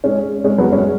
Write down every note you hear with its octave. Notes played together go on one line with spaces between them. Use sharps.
G#3 C#4
G#3 C#4
F#3 B3
G#3 C#4